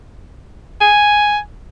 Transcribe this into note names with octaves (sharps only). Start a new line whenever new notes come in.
G#5